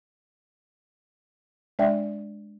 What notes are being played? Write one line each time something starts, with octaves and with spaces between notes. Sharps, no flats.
G#3 D4 D5 E5 G5